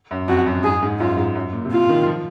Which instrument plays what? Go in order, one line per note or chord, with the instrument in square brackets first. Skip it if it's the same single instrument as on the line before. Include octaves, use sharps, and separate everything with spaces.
[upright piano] F#2
[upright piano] F2 [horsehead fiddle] F#4
[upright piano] F#2
[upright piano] G#2 [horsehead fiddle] G#4
[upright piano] G#2
[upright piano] F#2 [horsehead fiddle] F4
[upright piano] G#2
F#2
A#2
C3
[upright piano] A#2 [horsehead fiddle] F4
[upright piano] D#3
F3